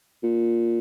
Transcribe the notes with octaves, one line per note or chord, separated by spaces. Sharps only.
A#2